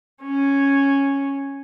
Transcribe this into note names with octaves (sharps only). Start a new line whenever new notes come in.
C#4